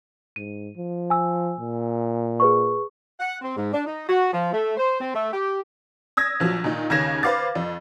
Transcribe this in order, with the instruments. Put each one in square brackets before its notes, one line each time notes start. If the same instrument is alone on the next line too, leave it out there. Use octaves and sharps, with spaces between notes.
[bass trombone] G#2 [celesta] D#7
[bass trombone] F3
[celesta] G#5 E6
[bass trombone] A#2
[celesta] G#4 B4 C#6
[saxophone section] F#5
C4
G#2
D4
D#4
F#4
F3
A3
C5
C4
A3
G4
[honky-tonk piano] D#6 E6 G#6 A#6
A#1 F3 F#3
A#2 D#3 D#4
D#2 C#3 C#4 G#6 A#6 E7
B4 C5 F5 D6 A6
F2